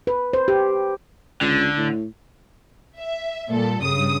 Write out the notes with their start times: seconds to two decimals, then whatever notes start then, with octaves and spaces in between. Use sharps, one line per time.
0.07 B4
0.33 C5
0.48 G4
1.41 C#2 D3
1.77 A2
2.98 E5
3.49 A#2 G3 A4
3.82 G2 C#3 D#6